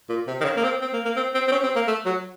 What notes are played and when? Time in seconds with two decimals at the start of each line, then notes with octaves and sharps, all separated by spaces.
0.09 A#2
0.27 C3
0.41 D#3
0.45 C#3
0.57 A#3
0.64 C4
0.81 C4
0.93 A#3
1.05 A#3
1.16 C4
1.34 C4
1.48 C4
1.51 C#4
1.63 C4
1.76 A#3
1.87 A3
2.05 F#3